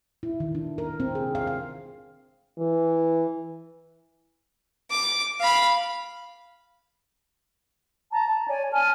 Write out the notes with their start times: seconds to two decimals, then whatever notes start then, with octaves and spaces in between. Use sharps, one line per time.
0.23 E4
0.40 D#3
0.55 D4
0.78 A#4
1.00 C4
1.15 G#4
1.35 F5
1.47 F5
2.58 E3
4.91 D6
5.41 F5 B5
8.12 A5 A#5
8.28 A5
8.48 C#5 D5 G#5
8.71 G#5 A5 F6